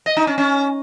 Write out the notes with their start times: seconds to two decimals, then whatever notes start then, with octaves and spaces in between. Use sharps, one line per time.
0.06 D#5
0.17 D#4
0.27 C#4
0.38 C#4